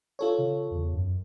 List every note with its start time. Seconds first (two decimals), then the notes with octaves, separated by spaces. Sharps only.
0.19 F4 A4 C#5
0.38 C#3
0.71 E2
0.93 F#2